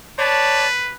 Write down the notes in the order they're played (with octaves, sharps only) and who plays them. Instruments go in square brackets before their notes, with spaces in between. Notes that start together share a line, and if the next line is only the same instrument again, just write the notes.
[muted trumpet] B4 [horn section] C#5 D5 A5